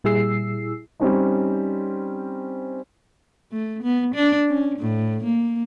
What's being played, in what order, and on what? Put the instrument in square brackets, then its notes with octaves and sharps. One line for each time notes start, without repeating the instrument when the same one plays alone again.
[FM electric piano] A#2 G3 E4 G#4 E6 C7
[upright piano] G3 C4 C#4 D#4
[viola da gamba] A3
B3
D4
C#4
A2
A#3